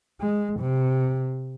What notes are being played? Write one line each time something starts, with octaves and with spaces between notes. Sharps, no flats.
G#3
C3